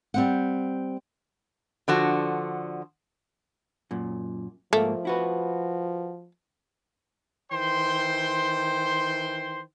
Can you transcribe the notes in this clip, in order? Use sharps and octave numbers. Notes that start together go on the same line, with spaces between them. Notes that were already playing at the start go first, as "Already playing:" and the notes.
G3 C4 F#5
D3 F3 F#4
F#2 A#2
G#2 F3 A3 A#3
E4 F#4 B4
D#3 E3 C5 G5 C6